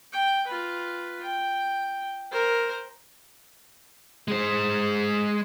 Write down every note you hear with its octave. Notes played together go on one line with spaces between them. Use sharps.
G5
F4 B4
G5
A#4 C5
G#3 C5